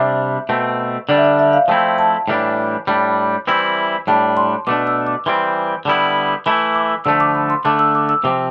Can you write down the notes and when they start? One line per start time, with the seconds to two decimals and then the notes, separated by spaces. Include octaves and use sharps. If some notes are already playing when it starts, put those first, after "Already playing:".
Already playing: C3 G3 D4 E5
0.49 B2 A3 C4
1.09 D3 G3 D4 D5
1.17 E5
1.24 D5
1.39 E5
1.53 F5
1.68 F3 A3 C4 E4 G5
1.98 A5
2.28 A2 E3 G3 D4
2.87 A2 G3 D4 B5
3.47 E3 G3 C4 E4
4.07 A2 G3 D4 A5
4.37 C6
4.67 B2 A3 D4 D6
4.87 E6
5.07 D6
5.26 E3 G3 C4 C6
5.85 D3 G3 B3 E4
6.46 E3 A3 E4 B5
6.75 D6
7.05 D3 F3 A3 E6
7.20 D6
7.35 B5
7.50 C6
7.65 D3 A3 D4 D6
7.79 E6
7.95 D6
8.09 E6
8.24 C3 F3 C4 D6